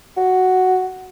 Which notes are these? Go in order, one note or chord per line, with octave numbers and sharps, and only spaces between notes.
F#4